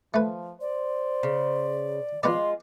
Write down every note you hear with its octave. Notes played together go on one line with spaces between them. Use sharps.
F3 A3 B4
C5 D5
C#3
F3 G#3 B3 F4 D5 C6